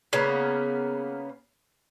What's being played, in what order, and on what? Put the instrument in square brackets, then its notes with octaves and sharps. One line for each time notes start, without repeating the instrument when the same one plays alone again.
[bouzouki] C#3 A#3 B3